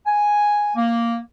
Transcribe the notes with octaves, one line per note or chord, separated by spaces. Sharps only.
G#5
A#3